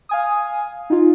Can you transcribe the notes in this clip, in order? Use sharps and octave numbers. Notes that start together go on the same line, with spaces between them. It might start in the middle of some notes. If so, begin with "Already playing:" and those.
F5 G#5 D#6
D#4 F4